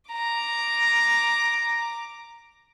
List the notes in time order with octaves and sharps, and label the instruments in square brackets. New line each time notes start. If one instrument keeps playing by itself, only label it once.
[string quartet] A#5 D6